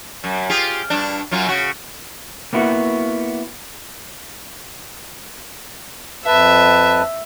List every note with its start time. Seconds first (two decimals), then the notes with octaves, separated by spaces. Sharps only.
0.24 F#2
0.50 F4 G4 G#4
0.90 G2 D4
1.31 F#2 F#3 F4
1.47 C#3 F#4
2.53 A#3 B3 E4 F#4
6.26 F2 B4 E5 A5